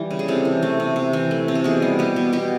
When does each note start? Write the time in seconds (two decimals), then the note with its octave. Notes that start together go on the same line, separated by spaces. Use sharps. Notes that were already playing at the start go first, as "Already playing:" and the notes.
Already playing: E3 G3
0.11 C#3
0.19 G#4
0.28 C3 A4
0.45 E3
0.63 A3
0.80 C3
0.96 C3
1.13 E3
1.31 A3
1.48 C3
1.55 A4
1.64 B2 G#4
1.82 G3
1.99 B3 G4
2.16 B2
2.33 B2 G4